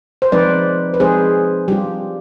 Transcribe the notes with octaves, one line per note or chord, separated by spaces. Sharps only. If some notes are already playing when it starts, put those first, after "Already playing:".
C5
F3 G#3 C4 D#4 B4 D5
B4
F3 G#3 C4 D#4 G#4 C5
G3 D4 F4 G4